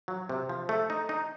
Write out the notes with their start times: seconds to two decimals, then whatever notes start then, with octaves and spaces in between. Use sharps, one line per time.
0.08 F#3
0.29 C3
0.49 F3
0.69 A3
0.90 D#4
1.09 D#4